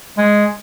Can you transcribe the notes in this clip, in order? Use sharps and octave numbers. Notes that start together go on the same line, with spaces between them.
G#3